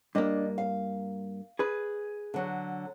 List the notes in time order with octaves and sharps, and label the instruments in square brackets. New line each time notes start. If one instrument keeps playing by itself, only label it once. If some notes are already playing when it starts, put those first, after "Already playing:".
[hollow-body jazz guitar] G2 A#3 [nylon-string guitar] D4 D#5
[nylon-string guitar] F5
[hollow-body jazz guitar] G#4 B4
[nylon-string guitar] D3 F#3